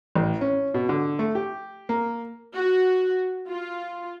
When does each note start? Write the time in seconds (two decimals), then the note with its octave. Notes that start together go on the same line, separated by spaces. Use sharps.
0.15 A1
0.41 C#4
0.74 B2
0.89 D3
1.19 A3
1.35 G4
1.89 A#3
2.56 F#4
3.48 F4